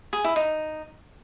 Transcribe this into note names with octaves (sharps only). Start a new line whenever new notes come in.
G#4
E4
D#4